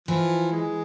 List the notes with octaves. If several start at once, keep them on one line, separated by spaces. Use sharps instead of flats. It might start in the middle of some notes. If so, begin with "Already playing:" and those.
E3 F3
G#3